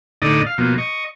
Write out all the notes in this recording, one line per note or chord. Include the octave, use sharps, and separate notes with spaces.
A2 D3 D#4 D5 D#5
F5
B2 F3 A#3
D#5 C#6